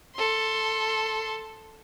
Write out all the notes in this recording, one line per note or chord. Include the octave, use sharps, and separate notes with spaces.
A4 C6